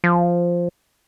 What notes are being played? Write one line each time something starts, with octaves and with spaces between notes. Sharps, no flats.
F3